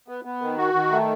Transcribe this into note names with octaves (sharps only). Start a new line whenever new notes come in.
B3
B3
D#3
F#4
D#3
A3